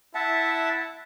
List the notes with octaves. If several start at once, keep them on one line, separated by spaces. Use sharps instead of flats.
E4 E5 F#5 A5